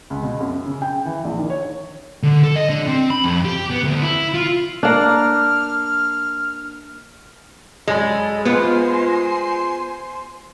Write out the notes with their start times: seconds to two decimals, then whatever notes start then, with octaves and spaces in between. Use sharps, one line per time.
0.10 C#2
0.23 B2
0.40 F#2
0.66 C#3
0.82 G5
1.05 E3
1.24 A#1
1.38 D#3
1.50 C#5
2.23 D3
2.44 A4
2.56 D#5
2.70 D3
2.88 C4
3.11 B5
3.24 F2
3.45 G4
3.71 B3
3.84 D2
4.02 E4
4.34 F4
4.83 A#3 D4 F6
7.88 F#2 G#3 A4 B5 E6
8.45 B3 F4 G4 B4 C5 G#5 C6